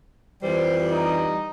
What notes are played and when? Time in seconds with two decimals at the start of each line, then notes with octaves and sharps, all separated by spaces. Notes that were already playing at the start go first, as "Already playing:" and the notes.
0.43 F2 E3 G3 C5
0.92 D#4